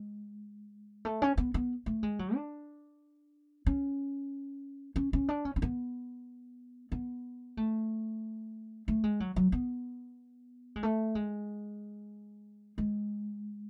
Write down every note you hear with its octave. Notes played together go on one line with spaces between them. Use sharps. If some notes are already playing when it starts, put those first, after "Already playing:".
Already playing: G#3
A3
C#4
B3
B3
A3
G#3
F#3
D4
C#4
C#4
C#4
D4
C#4
C#4
B3
B3
A3
A3
G#3
F#3
F#3
B3
G#3
A3
G#3
G#3